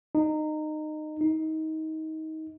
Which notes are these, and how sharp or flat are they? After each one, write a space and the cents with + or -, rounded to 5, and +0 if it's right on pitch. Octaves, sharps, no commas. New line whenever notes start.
D#4 -20
D#4 +25